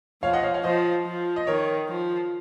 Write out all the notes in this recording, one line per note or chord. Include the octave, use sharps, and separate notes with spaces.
F3 C#5 F5
D#5 F#5
C#5 F5
C#5 F5
F3 C5 D#5
F3
D#5
D#3 A#4 C#5
F3